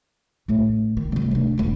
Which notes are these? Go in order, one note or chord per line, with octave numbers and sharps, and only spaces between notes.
A1 A2
D#3
C3 G3
A3 D4
E1 D3